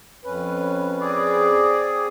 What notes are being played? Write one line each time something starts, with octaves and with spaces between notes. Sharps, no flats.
F2 C#4 B4
C4 G#4 D5